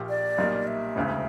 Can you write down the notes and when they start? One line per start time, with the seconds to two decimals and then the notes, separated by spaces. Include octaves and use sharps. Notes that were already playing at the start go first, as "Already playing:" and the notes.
Already playing: A#1 A#2 A#3 G4
0.09 D5
0.38 B1 A#2 G3 A#3
0.67 E5
0.96 E1 D2 C#3